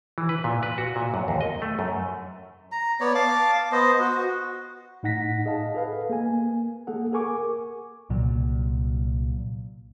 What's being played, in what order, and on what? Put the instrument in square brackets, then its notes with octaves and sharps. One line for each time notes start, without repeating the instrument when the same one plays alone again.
[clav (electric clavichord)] E3
B4
A#2
B4
F#4
A#2
F#2
D#2
D#5
A3
F#2
[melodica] A#5
B3 C#5 D5
F5 A5 D6
B3 C5 D#5
F#4
[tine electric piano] A2 D#4 F#5 A#6 B6
G#4 D#5 F5 A5
G#4 A4 B4 F5
A#3 G#5
A#3 G#4 A4 F#5
G#4 A#4 G#5 C#6 D6
[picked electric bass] C2 A#2 F#3